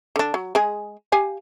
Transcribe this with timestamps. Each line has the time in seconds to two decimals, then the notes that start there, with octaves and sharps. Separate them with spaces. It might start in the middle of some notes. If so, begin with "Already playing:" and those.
0.16 D3 D4
0.34 F#3
0.55 G#3 G#4
1.12 G4 F5 G#5